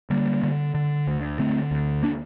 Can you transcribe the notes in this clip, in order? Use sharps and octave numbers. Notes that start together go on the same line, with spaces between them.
D3 G3 A#3
D3
D3
D2
D3 A3 C4
D2
A#3 D4